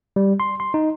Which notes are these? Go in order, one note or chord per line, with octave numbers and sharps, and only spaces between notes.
G3
C6
C6
D#4